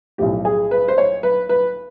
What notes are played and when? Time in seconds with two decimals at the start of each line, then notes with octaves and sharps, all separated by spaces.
0.18 B1 A2 F3 G4
0.45 G#4
0.71 B4
0.88 C5
0.98 C#5
1.23 B4
1.49 B4